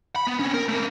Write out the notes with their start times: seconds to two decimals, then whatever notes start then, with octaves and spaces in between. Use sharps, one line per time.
0.16 B5
0.27 B3
0.39 C4 C#4
0.54 A#4
0.69 A3 A#4